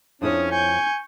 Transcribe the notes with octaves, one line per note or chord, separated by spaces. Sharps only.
F2 C#4 D4 E4 C#5 D#6
G#5 C#6 G6